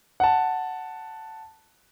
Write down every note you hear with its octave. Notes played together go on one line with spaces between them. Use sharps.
F#5 A5